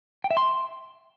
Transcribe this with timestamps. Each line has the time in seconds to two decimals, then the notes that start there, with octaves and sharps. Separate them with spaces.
0.24 G5
0.31 E5
0.37 C6